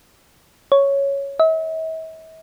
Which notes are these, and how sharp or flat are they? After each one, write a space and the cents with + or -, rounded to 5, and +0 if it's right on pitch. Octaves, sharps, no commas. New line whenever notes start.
C#5 +0
E5 -45